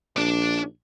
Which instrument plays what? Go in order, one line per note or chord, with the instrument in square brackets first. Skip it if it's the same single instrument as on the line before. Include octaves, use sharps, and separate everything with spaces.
[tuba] A#1 [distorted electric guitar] D4 D5